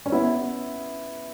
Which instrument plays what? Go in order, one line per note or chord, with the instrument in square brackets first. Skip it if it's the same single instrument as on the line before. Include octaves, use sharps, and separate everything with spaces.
[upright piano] C#4
B3 E4